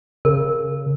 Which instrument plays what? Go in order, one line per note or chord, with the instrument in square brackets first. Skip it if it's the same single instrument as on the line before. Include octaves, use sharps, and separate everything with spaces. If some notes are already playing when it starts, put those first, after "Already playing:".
[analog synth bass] C#3 [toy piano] A#4